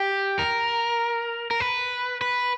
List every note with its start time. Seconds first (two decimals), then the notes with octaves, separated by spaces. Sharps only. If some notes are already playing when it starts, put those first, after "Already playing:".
Already playing: G4
0.39 A#4
1.51 A#4
1.60 B4
2.21 B4